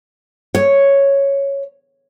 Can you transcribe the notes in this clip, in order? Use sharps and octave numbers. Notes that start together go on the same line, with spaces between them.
C#5